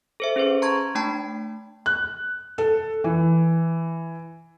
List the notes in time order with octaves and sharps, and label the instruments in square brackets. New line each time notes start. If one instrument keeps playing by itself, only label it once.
[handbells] A4 C5 E5
C#4 G#4 B4 C5
A5 A#5 C6 C#6 G#6
A3 D4 G5 A5 B5
[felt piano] F#6
A4
E3